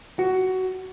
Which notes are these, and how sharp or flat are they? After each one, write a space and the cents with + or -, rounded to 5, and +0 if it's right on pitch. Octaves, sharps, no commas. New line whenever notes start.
F#4 +15